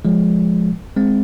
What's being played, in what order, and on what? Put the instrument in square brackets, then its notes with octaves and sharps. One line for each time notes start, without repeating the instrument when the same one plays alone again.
[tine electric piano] F3 G#3
G#3 C4